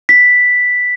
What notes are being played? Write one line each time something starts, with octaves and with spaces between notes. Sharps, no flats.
B6